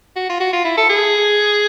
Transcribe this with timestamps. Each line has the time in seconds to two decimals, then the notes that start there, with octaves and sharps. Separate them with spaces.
0.16 F#4
0.29 F4
0.40 F#4
0.53 F4
0.64 E4
0.77 A4
0.89 G#4